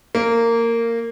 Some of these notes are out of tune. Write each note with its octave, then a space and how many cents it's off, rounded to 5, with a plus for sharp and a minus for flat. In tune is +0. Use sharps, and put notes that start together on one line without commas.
A#3 -15